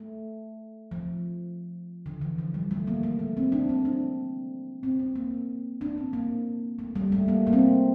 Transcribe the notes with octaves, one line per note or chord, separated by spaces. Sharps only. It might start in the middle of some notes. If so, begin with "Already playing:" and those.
Already playing: A3
F3
D3
E3
F3
G3
A3
A#3
A3
A#3
C4
D4
C4
D4
C4
C4
A#3
D4
C4
A#3
A3
G3
A3
A#3
A#3
C4